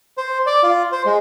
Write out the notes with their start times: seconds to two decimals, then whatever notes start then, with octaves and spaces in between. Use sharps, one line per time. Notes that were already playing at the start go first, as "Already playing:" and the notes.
0.18 C5
0.46 D5
0.63 F4
0.92 C5
1.05 G#3